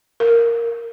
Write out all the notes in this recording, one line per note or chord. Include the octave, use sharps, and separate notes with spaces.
A#4